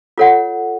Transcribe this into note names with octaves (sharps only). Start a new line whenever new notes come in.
F4 A4 C#5 F#5